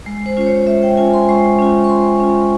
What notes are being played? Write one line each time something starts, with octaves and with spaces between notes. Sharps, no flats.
G#3
C5
C#4 F4 C5
C#5
G#3 E5
G5
C#4 F4 G#5
C6
G#3 C#6
C#4 F4
C#6
G#3 C6
C#4 F4